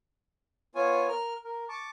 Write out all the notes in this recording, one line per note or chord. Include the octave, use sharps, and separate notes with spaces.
B3 F4 C#5 G#5
A#4 F6
A#4
A5 C#6 D6